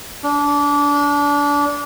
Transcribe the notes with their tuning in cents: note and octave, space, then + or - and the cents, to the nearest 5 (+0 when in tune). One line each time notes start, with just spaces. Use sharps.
D4 -25